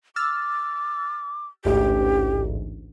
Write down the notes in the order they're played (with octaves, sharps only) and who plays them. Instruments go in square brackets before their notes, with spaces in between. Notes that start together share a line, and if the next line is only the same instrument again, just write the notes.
[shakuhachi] D6 [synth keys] E6 F6 A6
[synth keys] A1 D2 G#2 [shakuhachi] G4